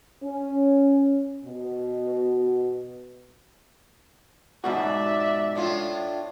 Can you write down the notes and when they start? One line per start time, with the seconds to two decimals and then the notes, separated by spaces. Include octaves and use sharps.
0.23 C#4
1.45 B2
4.64 G#2 B2 F#4 D5 E5
5.55 A2 D4 F4